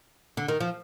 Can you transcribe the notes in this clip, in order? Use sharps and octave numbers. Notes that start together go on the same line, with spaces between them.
D3
D#3
F3